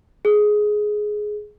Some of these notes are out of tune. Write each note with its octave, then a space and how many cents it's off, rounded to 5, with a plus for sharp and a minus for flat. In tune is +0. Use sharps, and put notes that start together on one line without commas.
G#4 +10